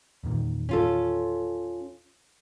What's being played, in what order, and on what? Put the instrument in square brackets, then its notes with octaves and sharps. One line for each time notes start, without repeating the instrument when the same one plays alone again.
[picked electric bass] E2 A#2 D#3
[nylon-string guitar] C#4 F4 A4